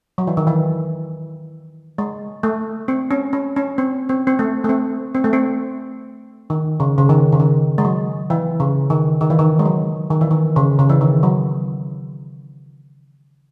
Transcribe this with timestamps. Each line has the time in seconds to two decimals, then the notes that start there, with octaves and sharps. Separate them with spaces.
0.18 F#3
0.27 E3
0.37 D#3
0.47 E3
1.98 G#3
2.43 A3
2.88 C4
3.11 C#4
3.33 C#4
3.56 C#4
3.78 C4
4.09 C4
4.27 C4
4.39 A3
4.64 A3
4.69 C4
5.15 C4
5.24 A3
5.33 C4
6.50 D#3
6.80 C#3
6.98 C#3
7.09 D#3
7.32 C#3
7.40 D#3
7.78 G#3
7.85 F#3
8.30 E3
8.60 C#3
8.90 D#3
9.21 D#3
9.30 E3
9.39 D#3
9.59 G#3
9.65 F#3
10.11 D#3
10.21 E3
10.31 D#3
10.56 C#3
10.79 C#3
10.90 E3
11.01 D#3
11.23 F#3